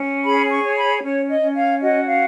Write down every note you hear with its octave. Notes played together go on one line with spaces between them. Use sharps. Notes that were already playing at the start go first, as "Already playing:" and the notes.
Already playing: C#4
G#4 B5
C#6
C#5
B5
C#4 C#5
D#5
C#4
F5
F#4 D#5
F5